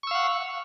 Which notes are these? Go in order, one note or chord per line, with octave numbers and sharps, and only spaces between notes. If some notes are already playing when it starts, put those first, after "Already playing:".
F5 F#5 C#6 E6